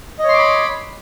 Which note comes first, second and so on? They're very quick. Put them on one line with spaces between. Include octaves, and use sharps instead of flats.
D#5 C#5 C6 D6 B5